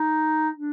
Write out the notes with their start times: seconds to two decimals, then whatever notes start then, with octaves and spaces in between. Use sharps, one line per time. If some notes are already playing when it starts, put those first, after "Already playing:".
Already playing: D#4
0.56 D4